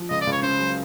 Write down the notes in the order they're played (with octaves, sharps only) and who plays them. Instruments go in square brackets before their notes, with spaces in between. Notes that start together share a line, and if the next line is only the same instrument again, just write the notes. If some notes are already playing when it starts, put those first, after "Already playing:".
Already playing: [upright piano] F3
[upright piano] C#2 [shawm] D#5
[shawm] D5
[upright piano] C#2
[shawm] C#5
[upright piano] C#3 [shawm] C5
[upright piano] F#3